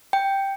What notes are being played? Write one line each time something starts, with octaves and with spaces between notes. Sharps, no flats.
G5